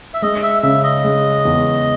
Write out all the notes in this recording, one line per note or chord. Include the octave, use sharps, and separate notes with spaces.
E5
G#3 D#5
E5
C#3 E5
D#5
G#3
E2